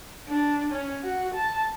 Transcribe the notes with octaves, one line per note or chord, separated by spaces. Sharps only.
D4
C#4
F#4
A5